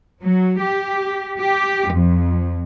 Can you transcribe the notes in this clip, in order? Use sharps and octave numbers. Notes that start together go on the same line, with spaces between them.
F#3
G4
G4
F2